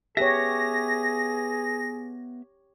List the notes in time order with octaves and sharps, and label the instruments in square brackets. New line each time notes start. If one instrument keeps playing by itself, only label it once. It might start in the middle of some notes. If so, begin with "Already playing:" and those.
[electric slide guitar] B3 B4 E5 [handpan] G4 C#5 [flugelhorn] G#4 [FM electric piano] A#6